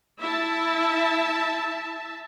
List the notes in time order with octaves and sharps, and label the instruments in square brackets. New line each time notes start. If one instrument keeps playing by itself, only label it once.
[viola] E4 [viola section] E5 A5